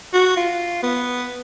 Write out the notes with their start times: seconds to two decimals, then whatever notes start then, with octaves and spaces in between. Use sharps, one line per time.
0.14 F#4
0.37 F4
0.83 B3